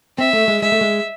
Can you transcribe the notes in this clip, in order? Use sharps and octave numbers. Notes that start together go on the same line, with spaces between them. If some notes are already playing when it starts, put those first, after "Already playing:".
C4 E5
A3
G#3
G#3 E5
A3
G#3